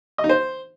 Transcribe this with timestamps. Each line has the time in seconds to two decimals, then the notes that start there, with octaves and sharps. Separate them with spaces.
0.18 D#5
0.24 D#4
0.29 C5